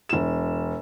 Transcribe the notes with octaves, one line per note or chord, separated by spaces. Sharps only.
E1 E7